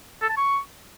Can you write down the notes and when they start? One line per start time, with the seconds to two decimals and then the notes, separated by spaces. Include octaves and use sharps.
0.22 A4
0.30 A5
0.37 C#6